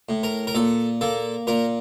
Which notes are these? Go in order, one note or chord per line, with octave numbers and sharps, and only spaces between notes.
A2
A#4
A#4
A#2 A4
A#3 A4
A#2 A#4